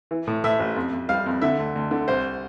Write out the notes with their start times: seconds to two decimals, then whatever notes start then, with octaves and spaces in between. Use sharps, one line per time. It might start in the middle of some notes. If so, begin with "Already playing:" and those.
0.11 E3
0.27 A2
0.44 A2 E5
0.60 A1
0.76 F2
0.93 F2
1.09 G3 F5
1.26 F2
1.42 D3 E5
1.58 D2
1.76 D2
1.91 D3
2.08 C2 C5